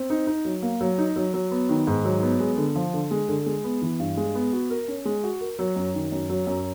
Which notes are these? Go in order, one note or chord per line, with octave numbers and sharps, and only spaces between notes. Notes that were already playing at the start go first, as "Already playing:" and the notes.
Already playing: C4
D#4
D#4
F#3
A#3
F#3
D#4
F#3
F#3
B3
D#3
G#2
F#3
B3
G#3
D3
F3
D3
G#3
D3
G#3
B3
E3
G2
G#3
B3
F#4
A#4
C#4
G#3
F#4
A#4
F#3
F#2
D#3
F#2
F#3
F#2